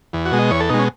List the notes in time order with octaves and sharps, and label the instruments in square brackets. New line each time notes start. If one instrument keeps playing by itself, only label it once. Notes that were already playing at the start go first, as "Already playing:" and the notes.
[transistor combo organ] E2
F#4
B2 G#3
D#5
E2 C#5
A4
B2 G#3 D#4
C#4